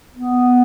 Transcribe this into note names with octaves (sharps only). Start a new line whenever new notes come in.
B3